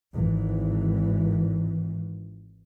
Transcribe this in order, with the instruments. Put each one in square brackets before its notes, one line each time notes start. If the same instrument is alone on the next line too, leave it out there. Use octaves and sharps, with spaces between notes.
[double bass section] G#1 E3